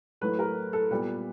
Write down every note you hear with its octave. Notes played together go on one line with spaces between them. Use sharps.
A2 F#3 A3 B4
A#4
A4
A#2 G3 B3 B4